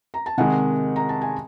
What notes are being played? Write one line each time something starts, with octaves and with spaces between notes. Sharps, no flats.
A#5
A5
C3 D#3 G#3 F#5 G#5
A#5
A5
G#5